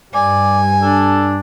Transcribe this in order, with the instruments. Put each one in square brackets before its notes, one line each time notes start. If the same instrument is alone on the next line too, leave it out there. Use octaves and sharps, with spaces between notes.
[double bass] G2 G3 [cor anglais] D5 [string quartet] G#5
[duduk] D4 [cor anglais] A4